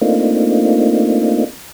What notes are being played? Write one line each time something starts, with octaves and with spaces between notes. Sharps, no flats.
A3 A#3 C4 D4 D#4 F4